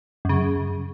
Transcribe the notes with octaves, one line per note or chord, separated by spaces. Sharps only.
F#2 C#3